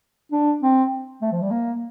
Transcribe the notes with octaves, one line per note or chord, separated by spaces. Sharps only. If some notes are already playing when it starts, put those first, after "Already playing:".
D4
C4
A3
F3
G3
A#3